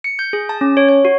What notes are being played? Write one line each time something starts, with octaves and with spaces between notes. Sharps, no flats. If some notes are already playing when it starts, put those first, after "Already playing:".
C#7
G6
G#4
A5
C#4
C#5
C#5
F#4